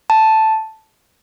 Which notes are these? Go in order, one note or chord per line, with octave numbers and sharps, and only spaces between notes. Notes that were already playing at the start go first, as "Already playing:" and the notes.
A5